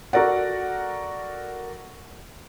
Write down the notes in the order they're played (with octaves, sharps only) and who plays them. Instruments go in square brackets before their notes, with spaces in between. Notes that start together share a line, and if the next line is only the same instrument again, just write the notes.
[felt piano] F#4 A4 A#4 D5 F#5